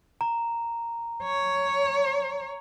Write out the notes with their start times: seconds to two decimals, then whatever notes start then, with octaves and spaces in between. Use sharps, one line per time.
0.21 A#5
1.23 C#5